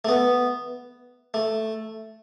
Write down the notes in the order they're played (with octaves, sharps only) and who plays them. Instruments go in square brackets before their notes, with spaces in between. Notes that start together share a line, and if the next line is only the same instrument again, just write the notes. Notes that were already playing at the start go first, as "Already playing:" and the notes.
[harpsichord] A3
B3
A3